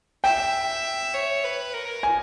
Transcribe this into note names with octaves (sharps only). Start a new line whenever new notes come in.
E5 G5
C#5
B4
A#4
G#5